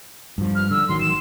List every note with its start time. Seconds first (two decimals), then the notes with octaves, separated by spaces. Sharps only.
0.38 G2 F3
0.55 F6
0.71 D3 E6
0.89 A1 D#3 F#3 C6
1.01 E7